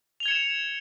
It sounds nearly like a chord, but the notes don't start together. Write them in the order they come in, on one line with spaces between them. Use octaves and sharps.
F7 G7 G#6 C#7 E7